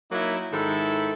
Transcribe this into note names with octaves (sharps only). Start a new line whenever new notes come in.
F#3 A#3 D#4 E4
G#2 D#3 E4 A4